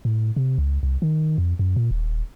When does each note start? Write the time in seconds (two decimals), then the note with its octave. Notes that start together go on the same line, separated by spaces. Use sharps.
0.05 A2
0.36 C3
0.58 C#2
0.83 C2
1.02 D#3
1.38 F2
1.59 F#2
1.76 A#2
1.91 D#1